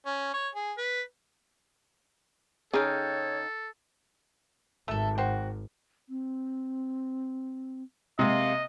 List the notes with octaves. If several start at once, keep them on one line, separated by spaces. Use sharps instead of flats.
C#4
C#5
G#4
B4
C#3 D#4 G#4 A4 C#5 F5 G5
G#1 A3 A4 E5
F#4 C5 G5
C4
C3 G#3 A#3 D#5 F5